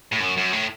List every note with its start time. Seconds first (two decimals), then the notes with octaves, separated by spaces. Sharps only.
0.13 A2
0.21 F#2
0.37 F#2
0.53 A2